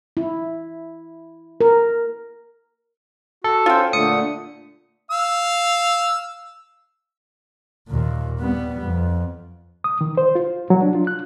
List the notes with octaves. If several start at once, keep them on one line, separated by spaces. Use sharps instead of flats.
E4
A#4
F#4 A4
C#4 F4 C5 G5
A#2 D3 A3 D#6 C#7
F5 E6
D#2 A#2
G3 B3
F2
D#6
D#3
C5
F4
F#3
D4
F4
F#6